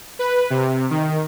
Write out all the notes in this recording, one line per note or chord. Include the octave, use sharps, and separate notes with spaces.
B4
C3
D#3